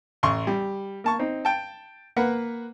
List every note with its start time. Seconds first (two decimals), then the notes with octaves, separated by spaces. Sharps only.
0.23 A1 C6 C#6
0.47 G3
1.04 A#3 A5 C#6
1.19 C4 D#4
1.45 G5 A5
2.17 A#3 B4 F#5